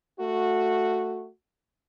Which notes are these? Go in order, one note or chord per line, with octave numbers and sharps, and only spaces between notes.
A3 F#4